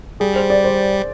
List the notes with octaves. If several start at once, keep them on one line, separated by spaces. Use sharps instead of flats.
G3 G#4
C5
D5
C5